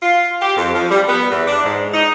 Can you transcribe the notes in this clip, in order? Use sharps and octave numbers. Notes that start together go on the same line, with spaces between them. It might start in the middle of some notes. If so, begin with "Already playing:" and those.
F4
G4
F2
F3
G3
B3
E2
D4
G#2
D#4